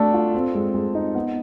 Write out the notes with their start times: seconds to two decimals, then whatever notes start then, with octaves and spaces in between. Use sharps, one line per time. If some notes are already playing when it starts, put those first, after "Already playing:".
Already playing: A3 D4 F#4 A4
0.14 F4
0.34 C4
0.55 G#3
0.74 G#3
0.95 D#4
1.15 B3